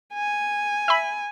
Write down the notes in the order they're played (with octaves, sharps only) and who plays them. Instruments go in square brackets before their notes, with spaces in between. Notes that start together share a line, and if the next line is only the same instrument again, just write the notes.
[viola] G#5
[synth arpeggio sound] E5 B5